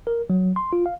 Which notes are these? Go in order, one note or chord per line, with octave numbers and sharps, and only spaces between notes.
A#4
F#3
C6
F4
F5